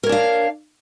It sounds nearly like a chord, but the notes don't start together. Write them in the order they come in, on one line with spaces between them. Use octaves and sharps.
A#4 C#5 D4 F5